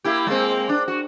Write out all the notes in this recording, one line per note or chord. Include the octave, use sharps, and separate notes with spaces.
A#3 E4 G4
G#3 A#3 C4
D4
F#4